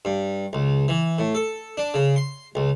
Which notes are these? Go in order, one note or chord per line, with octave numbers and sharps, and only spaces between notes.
G2
C#2
E3
A2
A4
D4
C#3
C6
C#2